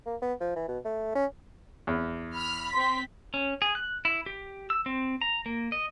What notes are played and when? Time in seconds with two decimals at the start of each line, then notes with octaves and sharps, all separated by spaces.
0.06 A#3
0.22 B3
0.40 F3
0.56 E3
0.68 B2
0.85 A3
1.15 C#4
1.87 E2
2.35 B5 F6
2.73 C4 C6 B6
3.34 C#4
3.62 G#4
3.75 F#6
4.05 E4
4.26 G4
4.70 E6
4.86 C4
5.21 A#5
5.46 A#3
5.72 D#5